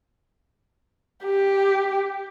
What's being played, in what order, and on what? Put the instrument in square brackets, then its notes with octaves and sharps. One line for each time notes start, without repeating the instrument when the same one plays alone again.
[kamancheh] G4